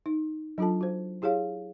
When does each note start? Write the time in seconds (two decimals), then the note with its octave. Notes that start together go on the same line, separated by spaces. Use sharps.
0.06 D#4
0.58 F#3 D4 F4 A4 A5
0.81 F#4 C5
1.22 E4 G4 G#4 C#5 F5